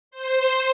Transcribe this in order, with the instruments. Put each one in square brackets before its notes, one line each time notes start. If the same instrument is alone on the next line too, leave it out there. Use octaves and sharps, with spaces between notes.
[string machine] C5